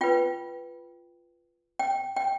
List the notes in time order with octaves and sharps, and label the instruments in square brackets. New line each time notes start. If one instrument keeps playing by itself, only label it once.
[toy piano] F4 B4 G5
G5
G5